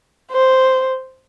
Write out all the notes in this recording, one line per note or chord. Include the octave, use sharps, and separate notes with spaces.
C5